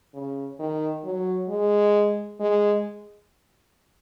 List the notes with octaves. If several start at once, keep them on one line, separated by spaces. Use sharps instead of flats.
C#3
D#3
F#3
G#3
G#3